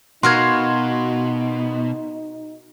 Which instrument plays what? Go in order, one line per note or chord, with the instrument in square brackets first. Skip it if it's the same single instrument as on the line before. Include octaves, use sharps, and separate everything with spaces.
[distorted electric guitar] B2 [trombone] D#4 [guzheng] F#4 A#4 F5 [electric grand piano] C6 G#6